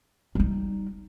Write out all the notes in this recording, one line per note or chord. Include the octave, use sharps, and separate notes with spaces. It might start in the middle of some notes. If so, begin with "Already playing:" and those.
G3 D#4